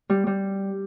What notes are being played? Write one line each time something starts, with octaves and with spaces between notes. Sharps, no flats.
G3
G3